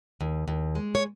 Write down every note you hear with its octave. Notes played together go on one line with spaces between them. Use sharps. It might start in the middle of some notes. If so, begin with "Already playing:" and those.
D#2
D#2
G#3
C#5